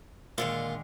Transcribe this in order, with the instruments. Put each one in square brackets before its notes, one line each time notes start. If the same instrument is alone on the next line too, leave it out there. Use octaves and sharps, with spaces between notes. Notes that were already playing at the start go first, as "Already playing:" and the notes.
[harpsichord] A#2 F4 [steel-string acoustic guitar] D3 D#3 G#3